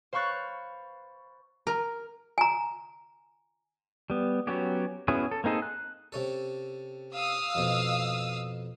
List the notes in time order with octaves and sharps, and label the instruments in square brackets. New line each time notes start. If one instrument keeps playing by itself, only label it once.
[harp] C5 F5 B5 C#6 F#6 A6
[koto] A#4
[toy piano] G#5 A#5
[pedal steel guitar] G3 B3
F#3 B3 C#4 F#4 G4
B3 C#4 E4 F#4 G#4
A4
A#3 C4 D#4 G#4 A4
F#6
[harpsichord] C3 C#4 A4
[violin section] F5 D#6 E6
[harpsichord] F2 B2